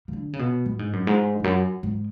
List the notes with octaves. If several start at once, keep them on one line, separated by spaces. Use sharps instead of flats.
C#3
D3
C#3
B2
A2
G#2
F#2
G#2
E2
F#2
G#2